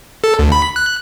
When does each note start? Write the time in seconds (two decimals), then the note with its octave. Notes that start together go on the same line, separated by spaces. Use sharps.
0.24 A4
0.39 D2
0.52 B5
0.76 F#6